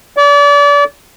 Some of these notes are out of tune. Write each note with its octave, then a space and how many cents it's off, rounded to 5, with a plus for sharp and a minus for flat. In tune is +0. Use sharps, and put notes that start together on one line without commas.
D5 -35